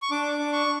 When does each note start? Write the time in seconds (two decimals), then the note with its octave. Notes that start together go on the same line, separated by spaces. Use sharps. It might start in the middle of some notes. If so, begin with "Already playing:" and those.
0.02 C#6
0.11 D4 D6
0.32 D6
0.39 D4
0.52 C#6